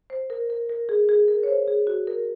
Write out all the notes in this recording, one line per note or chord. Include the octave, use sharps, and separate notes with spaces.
C5
A#4
A#4
A#4
G#4
G#4
A#4
C#5
C5
G#4
F#4
A#4